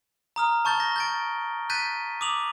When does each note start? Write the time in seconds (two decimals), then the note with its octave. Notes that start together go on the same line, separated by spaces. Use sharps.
0.36 A#5 D#6 F6
0.65 A5 C#6 G6 A6 G7
0.80 A#6
0.96 G6 A6 D7
1.70 F#6 G6 A6 B6 D#7
2.21 D6 D#6 F7 F#7